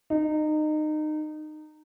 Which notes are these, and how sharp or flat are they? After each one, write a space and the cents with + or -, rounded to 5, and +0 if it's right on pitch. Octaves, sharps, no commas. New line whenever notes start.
D#4 -25